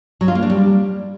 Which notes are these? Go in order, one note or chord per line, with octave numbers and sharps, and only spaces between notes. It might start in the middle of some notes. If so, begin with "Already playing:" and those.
F#3
F4
A#3
D4
G3